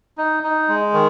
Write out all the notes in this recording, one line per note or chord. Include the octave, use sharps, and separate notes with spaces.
D#4
D#4
G#3
D#3